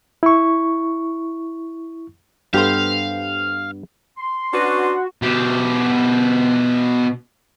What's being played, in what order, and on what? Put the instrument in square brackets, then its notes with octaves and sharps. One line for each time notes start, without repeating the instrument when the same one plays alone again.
[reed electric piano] E4 C#6
[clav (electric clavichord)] G2 B3 [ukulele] G4 A4 C5 [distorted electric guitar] F5
[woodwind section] C6
[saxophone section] C#4 D4 B4 [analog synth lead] F#4
[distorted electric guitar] B2 G4